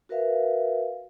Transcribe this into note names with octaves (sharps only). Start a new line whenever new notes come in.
F#4 A#4 B4 E5 F5